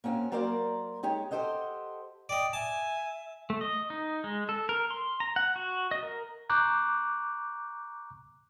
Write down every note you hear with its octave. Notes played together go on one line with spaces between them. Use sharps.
A#3 C4 C#4 F#4
F#3 A#3 A#4 C5 D5 A#5
G#3 D#4 G4 C#5
G4 A4 C5 D#5 F#5
D5 D#5 G5
E5 G#5 A5
A3
D#5
D#4
G#3
A4
A#4
C6
A#5
F#5
F#4
D#5
A#4
A#5 C#6 D6 F#6 G6